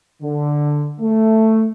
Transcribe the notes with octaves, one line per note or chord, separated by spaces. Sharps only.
D3
A3